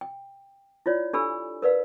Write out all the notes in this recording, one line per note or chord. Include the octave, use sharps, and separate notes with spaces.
G5
E4 F4 C#5 D5
D4 G4 A4 G#5 B5 E6
A#4 B4 D5 F5